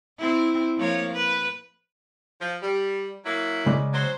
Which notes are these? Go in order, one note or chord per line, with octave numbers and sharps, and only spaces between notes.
C4 E4
F3 A#3 C#5
B4
F3
G3
F#3 A#3 E4
C#3 G#3 D5
F#3 C5